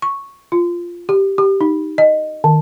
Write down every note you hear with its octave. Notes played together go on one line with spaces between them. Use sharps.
C#6
F4
G4
G4
D#4
D#5
D#3